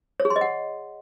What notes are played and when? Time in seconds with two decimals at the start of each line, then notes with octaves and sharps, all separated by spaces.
0.20 C#5
0.25 G#4
0.30 C6
0.36 D#5
0.41 F#5